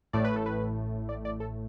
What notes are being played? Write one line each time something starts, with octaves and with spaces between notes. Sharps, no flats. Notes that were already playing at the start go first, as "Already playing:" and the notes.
A1 A2 A3 D5
B4
A4
B4
D5
D5
A4